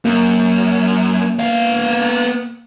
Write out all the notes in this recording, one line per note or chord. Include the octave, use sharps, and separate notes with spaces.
F#2 A#3
B3 F5